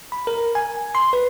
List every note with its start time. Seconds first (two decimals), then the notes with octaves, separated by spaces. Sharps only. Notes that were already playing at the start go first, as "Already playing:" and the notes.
0.12 B5
0.27 A#4
0.55 G#5
0.95 C6
1.13 B4